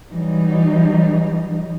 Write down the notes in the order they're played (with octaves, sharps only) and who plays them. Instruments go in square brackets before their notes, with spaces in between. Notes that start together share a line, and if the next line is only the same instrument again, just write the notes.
[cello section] E3 F#3 G3 D#4